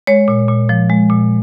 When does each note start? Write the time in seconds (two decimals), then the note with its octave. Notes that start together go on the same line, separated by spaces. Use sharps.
0.07 G#3 C#5
0.28 A#2
0.48 A#2
0.69 F3
0.90 G#3
1.10 A#2